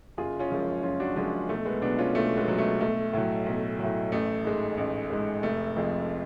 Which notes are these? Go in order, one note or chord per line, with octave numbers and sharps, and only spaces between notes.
F#1 F4 G#4
C#4 F4
F#2 F3 G#3
F#1 C#4 F4
D4 F#4
F#2 F3 G#3 C#4 F4
B1 A3
G#3 B3
B2 F#3 B3 D4
C#4 F4
B1 A3
G#3 B3
B2 F#3
A3
B1 A3
A2 F#3
B1
A2 F#3
A1 A3
G#2 G#3
A1
G#2 G#3
F1 A3
F2 F3 G#3